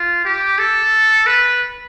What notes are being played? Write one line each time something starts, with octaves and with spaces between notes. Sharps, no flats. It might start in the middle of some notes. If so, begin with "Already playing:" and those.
Already playing: F4
G4
A4
B4